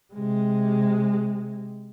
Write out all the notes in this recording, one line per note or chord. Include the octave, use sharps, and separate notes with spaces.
C3 G#3